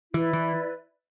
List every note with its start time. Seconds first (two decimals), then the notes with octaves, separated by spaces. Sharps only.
0.13 E3 E4 B4 D5
0.33 E3